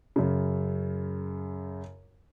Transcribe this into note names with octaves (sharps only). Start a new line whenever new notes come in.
F#2 C#3